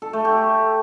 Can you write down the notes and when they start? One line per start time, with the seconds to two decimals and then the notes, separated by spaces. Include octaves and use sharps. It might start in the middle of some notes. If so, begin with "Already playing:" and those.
0.02 A4
0.13 A3
0.25 G4